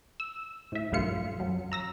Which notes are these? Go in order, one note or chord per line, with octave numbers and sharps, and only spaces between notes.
E6
A2 E5
B1 G2 A3 F4 C#7
F#2
A#5 E6 A#6